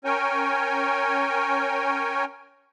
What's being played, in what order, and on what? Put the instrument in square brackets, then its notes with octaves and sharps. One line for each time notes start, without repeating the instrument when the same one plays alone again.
[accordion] C#4 A#4 C#5 G5 G#5